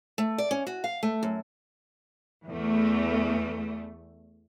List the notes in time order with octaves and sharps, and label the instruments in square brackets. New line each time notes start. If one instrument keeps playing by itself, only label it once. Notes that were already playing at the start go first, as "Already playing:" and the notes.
[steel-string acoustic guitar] A3
D5
C#4
F#4
F5
A3
F#2
[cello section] E2 A3